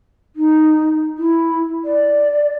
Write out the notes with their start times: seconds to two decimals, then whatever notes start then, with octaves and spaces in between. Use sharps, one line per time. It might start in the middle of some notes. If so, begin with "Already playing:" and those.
0.36 D#4
1.18 E4
1.85 D5